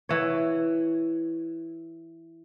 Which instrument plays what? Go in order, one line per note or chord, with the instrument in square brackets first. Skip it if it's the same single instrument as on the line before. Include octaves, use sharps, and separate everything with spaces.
[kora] E3 C#5